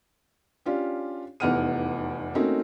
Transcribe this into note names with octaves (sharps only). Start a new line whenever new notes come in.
C#4 D4 F4 G4
F1 E2 D#4 F#5 F6 D#7
A3 A#3 C4 C#4 D#4 F#4